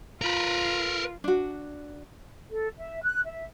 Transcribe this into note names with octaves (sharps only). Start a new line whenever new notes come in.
F4 A#4 B4
D4 F#4
A4
E5
F#6
E5